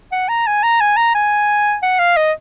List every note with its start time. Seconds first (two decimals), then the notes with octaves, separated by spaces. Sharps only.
0.12 F#5
0.29 A#5
0.47 G#5
0.63 A#5
0.81 G#5
0.97 A#5
1.15 G#5
1.83 F#5
1.99 F5
2.17 D#5